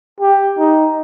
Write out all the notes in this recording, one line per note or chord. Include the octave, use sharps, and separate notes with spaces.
G4
D#4